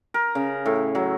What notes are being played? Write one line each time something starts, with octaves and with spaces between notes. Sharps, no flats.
A#4
C#3
A2
F#3